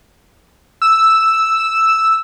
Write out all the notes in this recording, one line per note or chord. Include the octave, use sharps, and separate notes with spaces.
E6